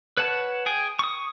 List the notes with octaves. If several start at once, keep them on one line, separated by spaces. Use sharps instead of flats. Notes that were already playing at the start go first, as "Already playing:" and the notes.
B4 C#5 F#5 A5
G#4 G5 G#5
C#6 D#6